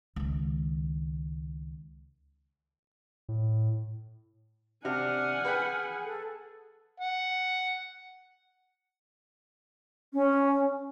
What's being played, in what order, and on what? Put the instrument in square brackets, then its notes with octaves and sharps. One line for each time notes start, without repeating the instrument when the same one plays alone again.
[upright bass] C#2 D#3
[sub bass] A2
[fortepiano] C3 [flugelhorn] D4 [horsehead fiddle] F#5 G#5 [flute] F6
[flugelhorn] G#4 [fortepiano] B4 G5 B5
[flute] A4
[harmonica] F#5
[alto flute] C#4